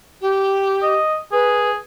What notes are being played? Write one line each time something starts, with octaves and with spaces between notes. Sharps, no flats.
G4
D#5
G#4 B4